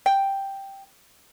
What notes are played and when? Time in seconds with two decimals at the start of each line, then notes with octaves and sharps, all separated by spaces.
0.06 G5